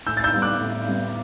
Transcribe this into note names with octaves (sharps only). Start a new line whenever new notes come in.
A2 E6 G6
A6
E6 G6
G3 B3
D6 F#6
A2
G3 B3